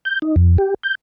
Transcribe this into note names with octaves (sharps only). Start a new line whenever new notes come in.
G6
D#4
F2
G4
G6